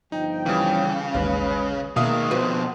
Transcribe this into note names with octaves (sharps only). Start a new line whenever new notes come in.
G1 F3 D#4 G5
C#3 E3 G3
A1 D#2 G#3 B4 F5
B2 D#3 G#3 A#3 E5 F5 D#6
F2 B2 F#4 B4 C5